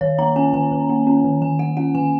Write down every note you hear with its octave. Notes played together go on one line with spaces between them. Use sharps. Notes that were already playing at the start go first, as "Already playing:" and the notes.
D#3 C#5
A#3 A#5
C#4 G#5
D#3 G#5
D#3
A#3
C#4
D#3
D#3 G#5
A#3 F#5
C#4 F#5
D#3 G#5